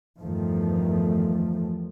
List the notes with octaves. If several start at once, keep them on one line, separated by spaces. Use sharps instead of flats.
E2 G2 D#3 F3 A3